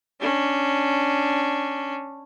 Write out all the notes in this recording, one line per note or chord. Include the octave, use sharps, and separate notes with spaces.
C#4 D4